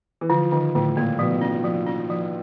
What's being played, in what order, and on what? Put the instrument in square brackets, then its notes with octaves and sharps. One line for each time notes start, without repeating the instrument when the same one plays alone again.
[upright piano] E3
[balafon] D3 [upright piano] F3
[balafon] D3 [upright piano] D#3
[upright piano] A2 [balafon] D3
[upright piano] A#2 [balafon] A#3
[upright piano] B2 [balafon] F3
[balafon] C#4
F3
C#4
F3